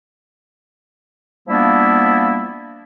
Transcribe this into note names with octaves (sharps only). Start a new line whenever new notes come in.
F3 G3 A#3 B3 D4 E4